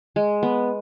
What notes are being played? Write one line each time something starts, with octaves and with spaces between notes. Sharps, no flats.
G#3
B3